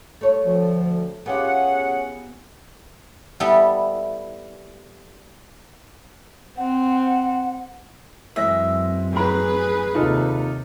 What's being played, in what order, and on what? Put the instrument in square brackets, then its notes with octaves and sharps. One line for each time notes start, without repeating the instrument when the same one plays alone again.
[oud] A3 C#5
[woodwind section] D2 F3
[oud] B3 F4 G4 [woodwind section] C#4 G#4 F#5
[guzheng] G3 B3 E4 A4
[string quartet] C4 [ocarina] F#5
[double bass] F#2 C4 [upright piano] E3 G#3 A#6 [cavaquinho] E5
[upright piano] A2 A#5 [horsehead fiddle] G#4 B4
[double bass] D#2 C3 [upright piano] D#4 F4 A4